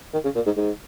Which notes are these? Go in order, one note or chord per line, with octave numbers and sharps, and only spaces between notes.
D#3
C#3
A#2
G#2
G#2